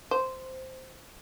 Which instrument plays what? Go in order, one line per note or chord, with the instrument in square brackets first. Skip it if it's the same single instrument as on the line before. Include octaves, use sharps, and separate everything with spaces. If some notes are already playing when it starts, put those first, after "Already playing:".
[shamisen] C5